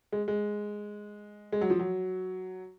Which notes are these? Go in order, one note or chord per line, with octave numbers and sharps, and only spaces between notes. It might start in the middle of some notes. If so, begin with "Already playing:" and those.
G#3
G#3
G#3
F#3
F3
F#3